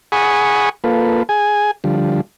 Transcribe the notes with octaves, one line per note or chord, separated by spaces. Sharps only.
G#4 F#5 G#5 B5 C#6 D#6
A#3 F4 A4 B4
G#4 G#5
D3 F3 G3